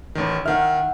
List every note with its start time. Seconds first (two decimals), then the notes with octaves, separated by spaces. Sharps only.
0.15 A1 D#3
0.46 D#3 E5 F#5 F6